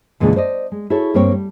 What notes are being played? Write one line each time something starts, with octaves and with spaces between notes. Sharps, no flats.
E2 A#2 C#3 E3 G#3 D4
C5 D5 D#5
G#3
E4 F#4 G#4 A4 C#5
G2 G3 A#3 C4 C#5 G5
G3